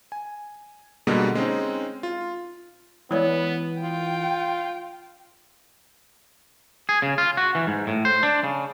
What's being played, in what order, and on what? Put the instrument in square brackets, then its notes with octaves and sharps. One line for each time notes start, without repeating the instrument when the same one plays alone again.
[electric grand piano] G#5
B2 D3 G3 G#3 A#3
G#3 C4 C#4 D#4
F4
[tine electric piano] E3 [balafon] G#3 C#5 D5 [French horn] B3
[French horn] F4 [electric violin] G5
[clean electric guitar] G#4
C#3
F4
F#4
E3
G#2
A2
C5
D4
C#3